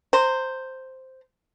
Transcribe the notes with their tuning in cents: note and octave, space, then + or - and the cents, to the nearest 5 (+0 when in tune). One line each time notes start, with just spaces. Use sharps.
C5 +0 A#5 -25